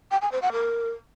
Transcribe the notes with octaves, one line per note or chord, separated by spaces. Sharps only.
G5
G#5
C5
F#5
A#4